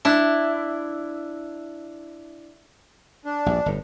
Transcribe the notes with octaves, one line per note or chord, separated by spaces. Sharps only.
D4 E4
D4
A#1 G2
G1 A2